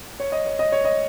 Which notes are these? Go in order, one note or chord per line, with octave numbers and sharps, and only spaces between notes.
C#5
D#5
C#5
D#5
C#5
D#5